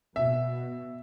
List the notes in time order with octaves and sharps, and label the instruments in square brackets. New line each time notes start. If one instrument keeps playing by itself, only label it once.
[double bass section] B2 [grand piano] E5